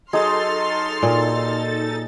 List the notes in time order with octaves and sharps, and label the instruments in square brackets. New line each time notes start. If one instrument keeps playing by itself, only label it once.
[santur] F#3 G#4 D#5 [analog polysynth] D#4 A4 A6 [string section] C6 F6
[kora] A#2